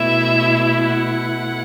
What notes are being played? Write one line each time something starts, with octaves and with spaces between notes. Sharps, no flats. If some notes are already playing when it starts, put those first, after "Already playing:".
Already playing: B2 A3 E4 E5
F#5